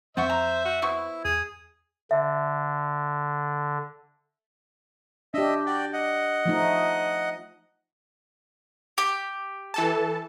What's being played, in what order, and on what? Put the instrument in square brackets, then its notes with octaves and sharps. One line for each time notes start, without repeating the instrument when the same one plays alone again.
[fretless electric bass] F2 F3 C4 [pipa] F4 F#5 C#6 [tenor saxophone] C5 [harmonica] E5
[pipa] A#5
[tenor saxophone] F#4
[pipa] B3 C5 C#6 [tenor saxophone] E4
[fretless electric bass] E2 [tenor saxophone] G#4
[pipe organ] D3 [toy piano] E5
[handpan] D4 G4 [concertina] D#5 E5
[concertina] F#4 D5 G5
D#5 F#5
[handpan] F3 A3 D#4
[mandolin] G4
[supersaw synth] E3 A4 A5